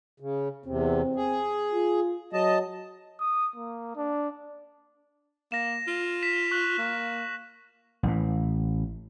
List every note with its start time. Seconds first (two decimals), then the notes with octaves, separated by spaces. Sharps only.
0.20 C#3
0.66 E2 C3 C4
1.16 G#4
1.72 F4
2.33 F#3 D#5 A5
3.20 D#6
3.56 A#3
3.96 D4
5.52 A#3 A#6 E7
5.87 F4
6.23 B6 E7
6.51 C#6 F#6 F#7
6.78 A#3
8.03 A1 A2